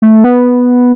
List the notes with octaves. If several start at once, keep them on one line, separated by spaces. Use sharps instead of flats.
A3
B3